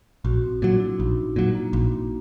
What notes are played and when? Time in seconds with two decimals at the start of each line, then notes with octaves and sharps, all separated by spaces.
0.25 A#1 F#4
0.44 C4
0.62 A#2 F#3 D4
0.80 E4
0.99 A#1 D#4
1.36 A#2 F#3 C4
1.55 A#3
1.73 A#1